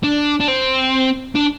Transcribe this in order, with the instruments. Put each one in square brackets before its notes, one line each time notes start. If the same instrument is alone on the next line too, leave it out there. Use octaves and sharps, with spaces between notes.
[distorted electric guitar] D4
D4
C4
D4